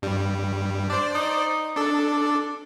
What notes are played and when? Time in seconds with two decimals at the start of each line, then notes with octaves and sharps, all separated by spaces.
0.02 G2 G3
0.90 D4 C5 D5
1.15 D#4
1.76 D4 A4 D5